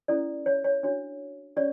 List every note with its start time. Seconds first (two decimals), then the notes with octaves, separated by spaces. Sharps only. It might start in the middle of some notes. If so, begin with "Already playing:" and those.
0.08 C#4 E4 A4 D5
0.46 C#5
0.64 C#5
0.83 D4 F#4 C#5
1.56 C#4 G4 C#5 D5